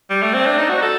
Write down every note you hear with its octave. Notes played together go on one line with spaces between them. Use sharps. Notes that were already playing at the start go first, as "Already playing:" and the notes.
G3
A3
C4
D4
D#4
F#4
A4